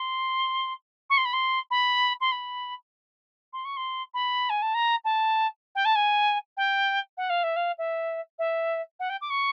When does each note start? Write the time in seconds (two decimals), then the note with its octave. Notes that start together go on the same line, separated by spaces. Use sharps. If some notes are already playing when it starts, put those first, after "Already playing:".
Already playing: C6
1.10 C#6
1.17 C6
1.25 B5
1.33 C6
1.71 B5
2.21 C6
2.32 B5
3.53 C6
3.65 C#6
3.77 C6
4.14 B5
4.50 G#5
4.62 A5
4.74 A#5
5.05 A5
5.75 G5
5.85 A5
5.96 G#5
6.57 G5
7.17 F#5
7.30 F5
7.43 E5
7.56 F5
7.78 E5
8.39 E5
9.00 F#5
9.10 G5
9.21 D6
9.30 C#6